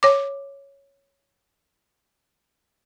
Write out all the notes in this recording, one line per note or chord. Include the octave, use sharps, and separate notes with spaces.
C#5 D6